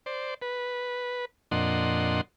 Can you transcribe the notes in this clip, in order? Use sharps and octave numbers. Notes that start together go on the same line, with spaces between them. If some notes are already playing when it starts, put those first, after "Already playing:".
C5 D5
B4
F2 A#2 D4 D#5 F#5 C6